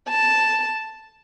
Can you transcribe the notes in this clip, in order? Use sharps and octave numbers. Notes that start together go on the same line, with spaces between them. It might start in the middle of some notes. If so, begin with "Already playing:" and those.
A5